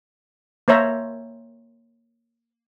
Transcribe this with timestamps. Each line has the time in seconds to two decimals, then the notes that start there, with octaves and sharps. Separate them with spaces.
0.68 A#3 C5 C#5 E5 A#5